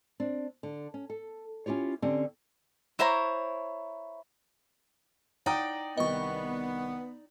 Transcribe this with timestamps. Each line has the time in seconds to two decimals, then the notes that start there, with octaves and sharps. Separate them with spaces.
0.20 C4 D4
0.63 D3
0.94 C#4
1.10 A4
1.66 C#4 E4 F4 G4 C#5
2.02 D3 C4 C#4 G4
2.99 E4 C5 C#5 A#5
5.46 D#4 D5 F#5 G5 A#5 D#6
5.98 C2 D#3 B3 D#5 C#6